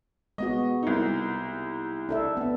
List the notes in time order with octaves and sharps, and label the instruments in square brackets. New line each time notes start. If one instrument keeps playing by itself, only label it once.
[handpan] G#3 B3 F#4 [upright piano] D#5
[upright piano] C2 D#4
[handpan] D4 A4 E5
B3 D4